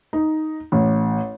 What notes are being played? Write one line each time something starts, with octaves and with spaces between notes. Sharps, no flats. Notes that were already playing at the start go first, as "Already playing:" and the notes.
D#4
A1